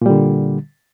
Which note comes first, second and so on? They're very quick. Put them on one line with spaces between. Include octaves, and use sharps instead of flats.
A#2 G3 D3